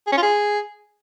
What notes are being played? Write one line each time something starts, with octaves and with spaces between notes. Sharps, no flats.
G#4
C#4
F4
G#4